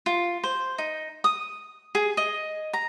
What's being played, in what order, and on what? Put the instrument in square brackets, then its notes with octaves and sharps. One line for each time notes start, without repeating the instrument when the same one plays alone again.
[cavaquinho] F4
C5
D#4
D#6
G#4
D#5
A#5